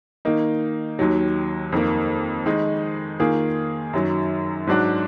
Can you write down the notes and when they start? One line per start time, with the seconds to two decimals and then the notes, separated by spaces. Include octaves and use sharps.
0.25 D#3 A#3 D#4
0.99 D#2 D#3 F#3
1.72 F2 D#3 A#3
2.46 D#3 G#3 D#4
3.20 D#3 A#3 F4 G#4
3.93 F#2 D#3 F#3
4.67 G#2 F#3 D4 F#4